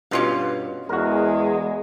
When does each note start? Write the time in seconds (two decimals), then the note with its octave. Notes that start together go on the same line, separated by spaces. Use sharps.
0.11 G2 B2 C#4 F4 F5
0.89 E2 G#3 F#4 A#4